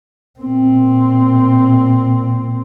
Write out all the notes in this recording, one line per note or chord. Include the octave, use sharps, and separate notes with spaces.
A#2 C4